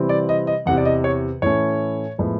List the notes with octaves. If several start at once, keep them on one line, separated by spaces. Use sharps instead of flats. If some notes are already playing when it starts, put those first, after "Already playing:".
Already playing: C3 E3 G3 C4
D5
D#5
D#5
E2 C3 E3 F#5
D5
D#5
C#5
A2 E3 A3 C#4 C#5
A2 F3 G#3 B3